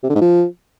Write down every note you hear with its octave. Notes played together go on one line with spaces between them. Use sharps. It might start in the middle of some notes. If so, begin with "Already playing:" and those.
C3
D3
G#2
F3